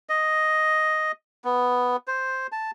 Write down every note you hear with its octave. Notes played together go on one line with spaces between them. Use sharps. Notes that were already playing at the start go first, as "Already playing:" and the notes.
D#5
B3
C5
A5